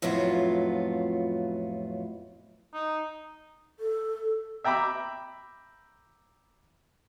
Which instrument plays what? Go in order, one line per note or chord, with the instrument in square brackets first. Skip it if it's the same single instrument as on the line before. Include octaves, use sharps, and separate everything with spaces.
[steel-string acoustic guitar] F2 A2 F#3 B3 F4
[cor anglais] D#4
[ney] A4
[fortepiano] E5 G5 A#5 B5 D6